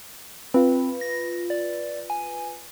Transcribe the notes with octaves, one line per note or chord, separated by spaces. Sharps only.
C4 F4 B4
A#6
D5
G#5